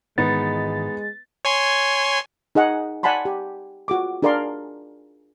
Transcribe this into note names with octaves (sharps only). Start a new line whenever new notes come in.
G#2 D#3 E3 G#3 B3 D#4 A6
C#5 G#5 C6
D#4 G#4 D#5 F#5
D5 F#5 G#5 A5 B5 C6
G4
F4 F#4 G#4 D6
D4 G#4 A#4 D5 F5 C6